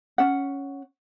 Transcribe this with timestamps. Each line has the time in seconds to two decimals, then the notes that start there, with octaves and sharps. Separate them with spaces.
0.18 C#4 F#5